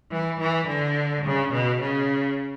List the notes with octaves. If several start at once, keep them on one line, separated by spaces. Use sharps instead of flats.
E3
E3
D3
C#3
B2
C#3